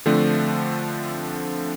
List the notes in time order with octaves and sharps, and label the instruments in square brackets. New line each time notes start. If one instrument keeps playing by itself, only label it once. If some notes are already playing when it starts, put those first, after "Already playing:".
[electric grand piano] D3 F3 A3 C4 D4